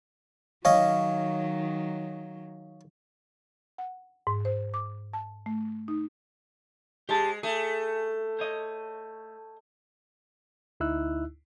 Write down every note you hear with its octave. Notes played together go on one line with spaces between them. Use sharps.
D#3 F#3 C#4 D#5 F5
F#5
G#2
C5
D6
A5
A3
D#4
G#3 G4 C5 A5
A3 G#4
C5 C#5 D#5
D2 D#4 E4 E6 F#6